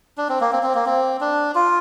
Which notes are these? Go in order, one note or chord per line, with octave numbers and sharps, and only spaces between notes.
D4
C4
A#3
C4
C4
A#3
C4
D4
F4